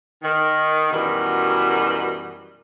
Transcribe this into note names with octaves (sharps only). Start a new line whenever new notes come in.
D#3
F#2 B2 D#3 E3 G3